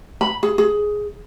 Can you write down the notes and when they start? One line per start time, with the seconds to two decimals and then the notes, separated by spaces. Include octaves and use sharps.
0.21 B5
0.43 G#4
0.58 G#4